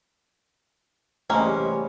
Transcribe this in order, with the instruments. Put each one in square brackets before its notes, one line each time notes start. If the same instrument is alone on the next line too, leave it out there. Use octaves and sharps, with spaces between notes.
[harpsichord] A1 C3 [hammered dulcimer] G3 G#3 [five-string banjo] A#3 C#4